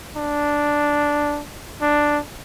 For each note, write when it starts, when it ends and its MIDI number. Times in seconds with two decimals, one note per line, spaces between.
0.16 1.42 62
1.82 2.19 62